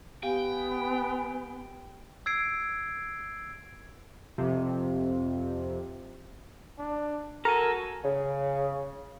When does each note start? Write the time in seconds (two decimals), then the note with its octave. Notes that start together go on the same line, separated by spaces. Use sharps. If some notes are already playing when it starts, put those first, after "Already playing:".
0.23 B3 G4 F5 G5 G#5
2.26 E6 G#6 C7 D7
4.38 F2 C3
6.79 D4
7.45 F#4 A4 A#4 G#5 A#5
8.04 C#3